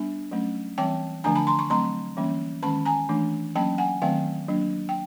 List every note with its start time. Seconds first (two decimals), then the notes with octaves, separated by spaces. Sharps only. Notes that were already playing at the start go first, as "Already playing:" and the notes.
Already playing: G3 B3 D4
0.32 F#3 A3 C#4
0.78 E3 G3 C4 G5 A5
1.24 D3 F3 A3 D4 G#5 A#5
1.35 A5 B5
1.47 A#5 C6
1.59 B5 C#6
1.70 F#3 A3 C4 A#5 C6
2.17 E3 G3 A#3 C#4
2.63 D#3 G#3 C#4 A5 B5
2.85 G#5 A#5
3.09 E3 A3 D4
3.55 F#3 A#3 C#4 G5 A5
3.78 F#5 G#5
4.02 D#3 F#3 A3 C4 F5 G5
4.48 F#3 A#3 D4
4.89 G5